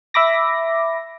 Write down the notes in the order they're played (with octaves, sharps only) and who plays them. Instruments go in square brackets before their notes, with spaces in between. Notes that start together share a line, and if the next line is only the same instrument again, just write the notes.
[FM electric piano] E5 B5 D6 A#6